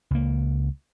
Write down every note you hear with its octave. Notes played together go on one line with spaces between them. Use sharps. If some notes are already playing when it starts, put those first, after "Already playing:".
C#2 A#3